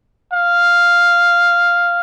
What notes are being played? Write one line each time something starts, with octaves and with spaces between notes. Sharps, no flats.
F5